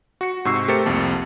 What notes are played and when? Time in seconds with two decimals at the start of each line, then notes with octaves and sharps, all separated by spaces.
0.21 F#4 C#7
0.45 G#2 C3 C#6 E6 C7
0.68 A3 G4 A#4 C5 A6 C#7
0.86 C2 F2 A#3 A5